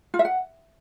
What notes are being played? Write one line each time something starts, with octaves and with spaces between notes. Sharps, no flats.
F4
E5
F#5